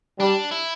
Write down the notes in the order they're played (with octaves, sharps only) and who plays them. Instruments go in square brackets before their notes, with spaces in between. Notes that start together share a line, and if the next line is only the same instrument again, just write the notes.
[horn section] G3 [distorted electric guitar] D4
[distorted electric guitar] E4